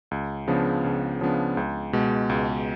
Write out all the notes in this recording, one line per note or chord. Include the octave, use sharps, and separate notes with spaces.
C#2
C#3 F3 B3 D4
C#2
C#3 F3 B3 D4
C#2
B2 G#3
C#2